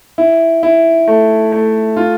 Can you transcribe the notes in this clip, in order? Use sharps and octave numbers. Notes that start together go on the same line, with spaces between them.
E4
E4
A3
A3
F4